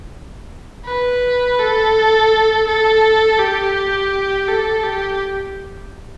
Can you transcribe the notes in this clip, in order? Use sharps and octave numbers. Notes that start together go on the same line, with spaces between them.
B4
A4
A4
G4
A4
G4